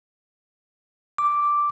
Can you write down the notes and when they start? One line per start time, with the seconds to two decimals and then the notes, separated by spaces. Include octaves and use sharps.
1.18 D6